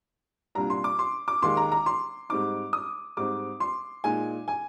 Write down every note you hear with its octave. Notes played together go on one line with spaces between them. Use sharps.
C2 A#2 G3 D4 A#5
C6
D6
C6
D6
D#2 D#3 G#3 C6
A#5
A#5
C6
G#2 G3 C4 D#4 D6
D#6
G#2 G3 C4 D#4 D6
C6
A#2 G#3 D#4 G#5
G#5